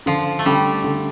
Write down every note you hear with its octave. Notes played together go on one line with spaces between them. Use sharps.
D3 F3
A3
D3 G3
D3